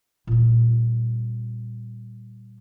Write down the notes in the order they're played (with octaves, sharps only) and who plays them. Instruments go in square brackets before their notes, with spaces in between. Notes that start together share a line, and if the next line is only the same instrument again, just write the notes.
[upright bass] A#2 G3